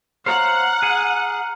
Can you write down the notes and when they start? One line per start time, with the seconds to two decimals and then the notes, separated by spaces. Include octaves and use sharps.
0.26 C5 C#5 F5 F#5 A#5 F6
0.82 G#4 G#5